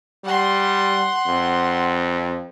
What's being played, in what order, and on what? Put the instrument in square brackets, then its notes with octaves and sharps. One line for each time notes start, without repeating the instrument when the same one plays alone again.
[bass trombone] G3 [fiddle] F#5 C6
[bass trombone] F2